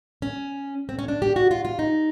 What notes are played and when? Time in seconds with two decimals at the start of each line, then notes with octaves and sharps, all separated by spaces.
0.22 C#4
0.89 C4
0.99 C#4
1.08 D4
1.22 G4
1.36 F#4
1.51 F4
1.65 F4
1.79 D#4